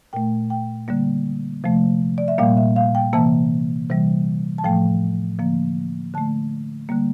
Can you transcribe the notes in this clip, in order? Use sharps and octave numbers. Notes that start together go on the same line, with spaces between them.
A#2 A3 G5
G5
D3 G3 A#3
C3 F3 A3
D5
E5
A#2 G3 A#3 F5
E5
F5
G5
C3 E3 A#3 A5
C3 E3 G3
A5
A2 F3 A3 G5
D3 F3 A#3
D3 A3 A5
D3 G3 A#3